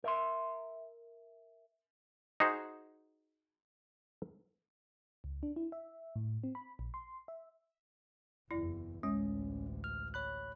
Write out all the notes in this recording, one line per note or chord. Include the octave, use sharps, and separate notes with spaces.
A#4 E5 C6
D#4 F#4 G#4 C5
C#2
D4
E4
E5
A2
C4
B5
A#1
C6
E5
F#1 E2 E4 D5
A1 D2 G#3 C#4
F6
C#5 B5 F#6